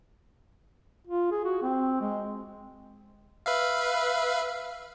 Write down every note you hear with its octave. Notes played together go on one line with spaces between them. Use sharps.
F4
G#4
F#4
C4
G#3
B4 E5 F5